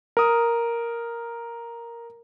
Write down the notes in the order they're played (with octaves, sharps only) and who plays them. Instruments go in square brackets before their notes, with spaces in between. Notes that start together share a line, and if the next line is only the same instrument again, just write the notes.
[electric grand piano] A#4 D#6